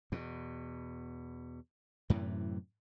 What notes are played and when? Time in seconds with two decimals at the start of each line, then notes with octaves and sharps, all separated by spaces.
0.12 E2 B2
2.10 F#2 A2 C3 E3